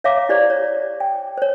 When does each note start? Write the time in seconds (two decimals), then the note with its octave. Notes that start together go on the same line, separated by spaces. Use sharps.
0.04 C#5 E5 F5 A#5 D6
0.29 E4 G4 C5 D5
0.50 C#5
1.00 G5
1.38 C5 C#5